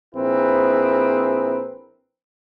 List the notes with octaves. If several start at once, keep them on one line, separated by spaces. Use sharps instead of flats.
A#1 C4 E4 G#4 A#4 B4